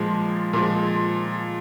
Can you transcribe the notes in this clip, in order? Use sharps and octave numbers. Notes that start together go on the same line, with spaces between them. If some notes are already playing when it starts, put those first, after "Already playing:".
Already playing: A#2 F3 G#3
A#2 F3 G#3